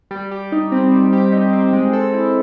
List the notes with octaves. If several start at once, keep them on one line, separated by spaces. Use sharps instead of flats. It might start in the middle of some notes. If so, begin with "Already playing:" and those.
G3
G4
D#4
C4
G3
G4
D#4
C4
G#3
A4
E4